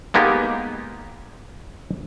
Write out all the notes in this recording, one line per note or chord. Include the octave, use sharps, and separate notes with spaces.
G#3 A#3 B3 D#4 G4